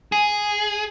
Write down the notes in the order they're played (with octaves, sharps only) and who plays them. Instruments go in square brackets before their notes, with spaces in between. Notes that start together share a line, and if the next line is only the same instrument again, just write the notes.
[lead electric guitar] G#4